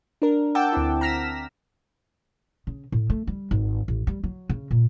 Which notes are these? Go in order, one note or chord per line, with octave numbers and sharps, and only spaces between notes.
D4 A#4
F#5 G5 A5 D6 E6 G6
D2 C4 E4
A#5 F6 A#6 B6 E7
C#3
A2
A3
G3
G#1
A1
G3
F#3
C#3
A#2